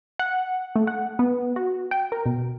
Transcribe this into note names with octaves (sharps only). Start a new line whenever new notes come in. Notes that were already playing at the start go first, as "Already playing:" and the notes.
F#5
A3
F#5
B3
F#4
G5
A#4
B2